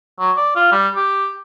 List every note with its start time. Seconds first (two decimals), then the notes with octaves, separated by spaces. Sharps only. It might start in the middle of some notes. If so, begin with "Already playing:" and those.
0.20 F#3
0.37 D5
0.56 F4
0.72 G3
0.95 G4